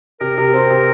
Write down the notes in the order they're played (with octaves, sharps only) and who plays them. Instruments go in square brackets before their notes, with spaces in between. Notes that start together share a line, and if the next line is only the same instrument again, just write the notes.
[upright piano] C3 [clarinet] A#4
[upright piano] C3
C4
C3